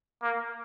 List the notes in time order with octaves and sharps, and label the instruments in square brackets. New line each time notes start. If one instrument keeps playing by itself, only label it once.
[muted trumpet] A#3